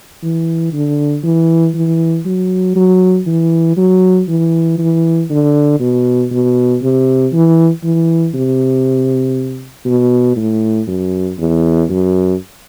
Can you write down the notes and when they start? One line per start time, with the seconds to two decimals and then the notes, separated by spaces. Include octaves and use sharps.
0.23 E3
0.73 D3
1.24 E3
1.75 E3
2.26 F#3
2.76 F#3
3.27 E3
3.77 F#3
4.28 E3
4.79 E3
5.30 D3
5.80 B2
6.31 B2
6.82 C3
7.33 E3
7.83 E3
8.34 C3
9.86 B2
10.36 A2
10.87 F#2
11.38 E2
11.89 F#2